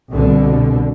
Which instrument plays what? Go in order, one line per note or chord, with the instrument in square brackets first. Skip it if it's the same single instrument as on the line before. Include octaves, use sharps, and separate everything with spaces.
[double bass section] C2 B2 D3